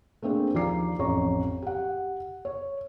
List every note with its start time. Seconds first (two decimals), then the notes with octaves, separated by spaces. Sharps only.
0.22 A3 A#3 C4 D4 G#4
0.54 D#2 F3 D5 A#5 D6 C7
0.99 A1 F2 C#5 A#5 C#6
1.62 G4 F#5
2.45 C#5